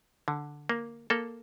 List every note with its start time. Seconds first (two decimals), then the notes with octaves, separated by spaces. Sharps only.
0.28 D3
0.69 A#3
1.10 A#3 A4